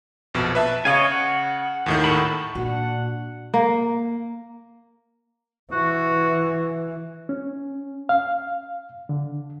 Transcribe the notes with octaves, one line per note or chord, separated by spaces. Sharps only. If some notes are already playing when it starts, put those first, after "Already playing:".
A#1 F2 B2
B4 E5 A5
C#3 C#5 D#5 F5 G#5
F#5
D#2 A2 D#3
F#4 A4 B5
A#2 D4 F#4 F#5
A#3
E3 F#4
C#4
F5
D3